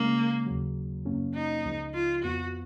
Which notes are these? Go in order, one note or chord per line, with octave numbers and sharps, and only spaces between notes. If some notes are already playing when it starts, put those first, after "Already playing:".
Already playing: C#3 G#3 A#3 C#4
D#2 C#3 F#3
F#2 C#3 F#3 A#3 C#4
D#4
C#2 C#3 F3
F4
F2 F3 B3 F4 F#4